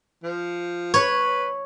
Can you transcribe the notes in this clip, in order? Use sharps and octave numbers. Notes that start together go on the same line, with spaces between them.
F3
B4 C#5